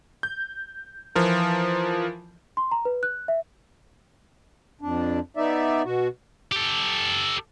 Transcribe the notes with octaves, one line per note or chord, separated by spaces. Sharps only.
G6
E3 F3 F4 A#4
C6
A#5
B4
F#6
E5
F2 D4
B3 D#4 D5 E5
B2 F#4
G4 A4